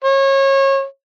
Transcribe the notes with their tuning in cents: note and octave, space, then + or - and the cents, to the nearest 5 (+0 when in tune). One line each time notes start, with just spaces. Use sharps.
C#5 -30